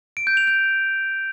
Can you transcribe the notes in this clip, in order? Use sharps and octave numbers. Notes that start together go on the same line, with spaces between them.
D7
G6
F7
G6